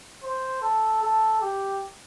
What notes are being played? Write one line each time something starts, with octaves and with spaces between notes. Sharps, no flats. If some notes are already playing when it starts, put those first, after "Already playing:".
C5
A4
A4
G4